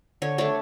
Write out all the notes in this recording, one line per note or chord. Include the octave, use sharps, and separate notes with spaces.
D3 C#5
A3 D4 C#5